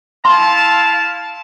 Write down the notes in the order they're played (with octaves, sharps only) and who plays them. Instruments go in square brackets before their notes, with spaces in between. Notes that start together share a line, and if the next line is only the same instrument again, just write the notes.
[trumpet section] E4 F5 A5 [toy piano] C6